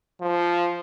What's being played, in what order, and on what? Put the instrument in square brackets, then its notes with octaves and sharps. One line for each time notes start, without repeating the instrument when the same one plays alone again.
[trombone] F3